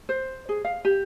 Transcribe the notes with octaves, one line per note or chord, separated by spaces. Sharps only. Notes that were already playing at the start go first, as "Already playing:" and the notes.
C5
G#4
F5
G4